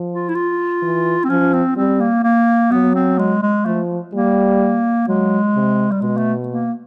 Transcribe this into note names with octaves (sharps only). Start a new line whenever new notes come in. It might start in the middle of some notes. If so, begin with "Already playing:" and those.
Already playing: F3
F4
E4
F4
E3
C4
F3 C#4
C4
G3 C4
A#3
A#3
F#3 B3
C4
G#3
G#3
F3 A3
G3 A#3
F#3 G#3
C3
G3
B2 G#3
A3
A#3